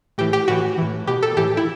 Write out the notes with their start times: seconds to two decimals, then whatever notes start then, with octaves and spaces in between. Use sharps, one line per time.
0.18 A2 E3 G4
0.33 G4
0.48 A2 E3 F#4
0.78 A2 E3
1.07 B2 G4
1.23 A4
1.37 A2 E3 G4
1.57 E4